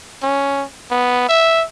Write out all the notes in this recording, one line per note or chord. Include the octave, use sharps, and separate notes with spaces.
C#4
B3
E5